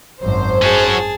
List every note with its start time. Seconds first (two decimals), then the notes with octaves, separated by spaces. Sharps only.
0.22 G#1 F#2 C5
0.62 C#4 F#4 G#4 A5